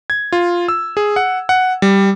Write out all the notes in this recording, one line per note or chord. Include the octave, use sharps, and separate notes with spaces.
G#6
F4
E6
G#4
F#5
F#5
G3